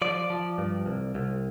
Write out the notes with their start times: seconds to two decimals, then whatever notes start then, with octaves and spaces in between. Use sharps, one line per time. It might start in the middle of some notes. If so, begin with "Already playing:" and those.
0.02 F3 D5
0.30 F3
0.58 G2
0.86 C2
1.15 C2